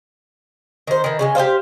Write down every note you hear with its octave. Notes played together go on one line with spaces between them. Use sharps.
D#3 C5
D#3 E3
C#3 G3 G#3
G4 A4 C5 F5